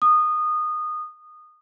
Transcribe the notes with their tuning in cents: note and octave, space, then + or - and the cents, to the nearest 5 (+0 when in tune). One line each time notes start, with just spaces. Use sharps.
D#6 -20